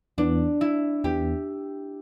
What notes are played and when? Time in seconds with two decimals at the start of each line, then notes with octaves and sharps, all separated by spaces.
0.18 E2 E3 B3 D4
0.61 E4
1.04 E2 E3 B3 G4